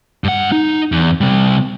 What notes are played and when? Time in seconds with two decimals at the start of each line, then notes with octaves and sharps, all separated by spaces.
0.24 G2 F#5
0.52 D#4
0.92 E2
1.21 C3 G3